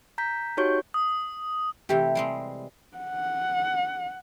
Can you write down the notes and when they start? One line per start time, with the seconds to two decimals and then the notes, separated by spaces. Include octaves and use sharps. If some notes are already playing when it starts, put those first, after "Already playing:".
0.18 A#5 G6 B6
0.57 D#4 F#4 G4 C#5 C#6 G6
0.94 D#6
1.89 C3 E3 A3 G4
2.15 G3 G#3 C4
2.98 F#5